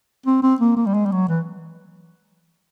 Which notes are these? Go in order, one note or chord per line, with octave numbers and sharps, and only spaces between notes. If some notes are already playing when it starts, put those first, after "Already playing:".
C4
C4
A#3
A#3
G3
G#3
G3
F#3
E3